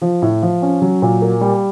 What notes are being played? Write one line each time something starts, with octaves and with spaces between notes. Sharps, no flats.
F3
A2
F3
C#4
F#3
A#2
A#3
G3